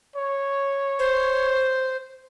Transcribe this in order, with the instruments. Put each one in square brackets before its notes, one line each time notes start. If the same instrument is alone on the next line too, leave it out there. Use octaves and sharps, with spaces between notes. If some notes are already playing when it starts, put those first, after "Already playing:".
[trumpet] C#5
[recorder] C5